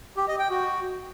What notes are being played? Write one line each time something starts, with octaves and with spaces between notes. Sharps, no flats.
G4
D#5
G5
F#4